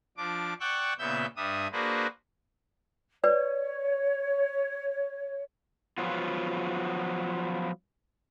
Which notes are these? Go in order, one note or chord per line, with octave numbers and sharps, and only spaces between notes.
F3 D4 D6
D5 F#5 G5 C#6 E6 F#6
A#2 C#3 B3 E5 E6 G6
G2 G3 D4 E5 D#6
A#3 D4 F#4 G#4 B4 C5
B4 C#5 D5
F3 F#3 B3 F4